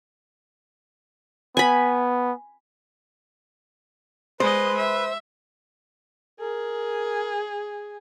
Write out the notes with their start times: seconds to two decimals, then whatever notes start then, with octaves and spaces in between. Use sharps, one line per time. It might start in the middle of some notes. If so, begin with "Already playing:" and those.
1.57 B3 G#5 B5
4.40 G#3 B4 C5 D#5
4.78 E5
6.41 G#4 A#4